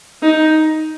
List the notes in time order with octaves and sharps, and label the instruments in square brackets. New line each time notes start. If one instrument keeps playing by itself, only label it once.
[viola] D#4